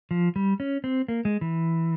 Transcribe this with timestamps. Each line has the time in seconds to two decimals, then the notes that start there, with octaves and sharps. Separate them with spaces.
0.11 F3
0.36 G3
0.60 C#4
0.84 C4
1.08 A#3
1.25 G#3
1.41 E3